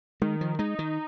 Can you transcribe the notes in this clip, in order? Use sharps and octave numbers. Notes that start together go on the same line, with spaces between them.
D#3 G#3
F3
G#3 D#4
D#3